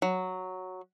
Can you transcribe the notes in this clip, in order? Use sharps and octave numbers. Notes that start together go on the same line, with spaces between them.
F#3